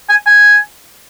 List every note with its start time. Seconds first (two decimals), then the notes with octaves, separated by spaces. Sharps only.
0.09 G#5
0.26 G#5